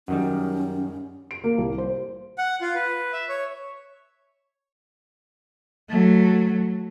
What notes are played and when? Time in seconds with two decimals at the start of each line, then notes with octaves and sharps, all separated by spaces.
0.08 F#2 D#3 G3 C#4
1.31 D7
1.44 A#3
1.58 C2
1.78 C5
2.38 F#5
2.61 F4
2.75 B4
3.13 E5
3.29 C#5
5.89 F#3 A3